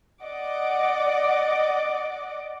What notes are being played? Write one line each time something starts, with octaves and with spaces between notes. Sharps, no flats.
D5 D#5 F#5 D6